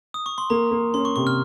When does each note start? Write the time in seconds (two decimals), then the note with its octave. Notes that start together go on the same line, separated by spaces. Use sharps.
0.14 D#6
0.26 C#6
0.38 C6
0.50 A#3 A#5
0.71 A#3
0.94 C#4 C6
1.05 C#6
1.16 C3 C#6
1.27 F6